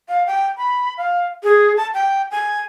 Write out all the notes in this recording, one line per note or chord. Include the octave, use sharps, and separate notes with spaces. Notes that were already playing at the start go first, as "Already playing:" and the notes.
F5
G5
B5
F5
G#4
A5
G5
G#5